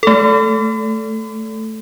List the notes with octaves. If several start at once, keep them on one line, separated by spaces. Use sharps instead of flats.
A3 A4